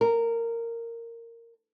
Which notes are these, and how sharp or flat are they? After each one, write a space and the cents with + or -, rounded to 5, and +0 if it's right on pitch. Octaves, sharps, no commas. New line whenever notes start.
A#4 -15